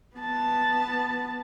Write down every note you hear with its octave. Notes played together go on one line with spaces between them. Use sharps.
B3 A5